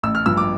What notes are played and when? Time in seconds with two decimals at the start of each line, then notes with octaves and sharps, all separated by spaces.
0.03 A1 E6
0.15 F6
0.26 G2 F3 E6
0.37 D6